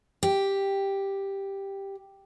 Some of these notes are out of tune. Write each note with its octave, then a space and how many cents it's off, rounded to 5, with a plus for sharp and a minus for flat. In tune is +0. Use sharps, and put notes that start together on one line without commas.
G4 +5